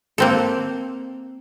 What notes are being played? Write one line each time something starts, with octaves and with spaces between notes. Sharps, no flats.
A#3 C4 A4